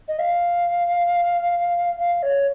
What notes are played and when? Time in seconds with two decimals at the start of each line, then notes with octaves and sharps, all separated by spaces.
0.08 D#5
0.19 F5
1.99 F5
2.23 C#5